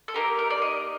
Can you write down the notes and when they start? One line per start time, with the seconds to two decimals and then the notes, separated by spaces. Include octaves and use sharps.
0.08 A4
0.14 A#3 D#4 G4 A#4
0.39 A#4
0.50 D5
0.62 D#5